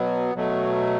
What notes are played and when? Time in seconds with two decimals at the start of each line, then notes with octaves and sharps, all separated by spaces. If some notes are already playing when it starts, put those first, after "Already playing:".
Already playing: B2 F#3 B3
0.35 B2 F#3 A3